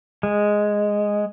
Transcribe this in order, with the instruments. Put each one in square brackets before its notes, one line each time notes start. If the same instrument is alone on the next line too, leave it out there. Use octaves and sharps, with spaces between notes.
[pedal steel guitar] G#3